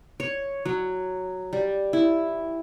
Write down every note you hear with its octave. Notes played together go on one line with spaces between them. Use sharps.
C#5
F#3
G3
E4